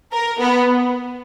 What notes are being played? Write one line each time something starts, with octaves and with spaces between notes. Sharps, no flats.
A#4
B3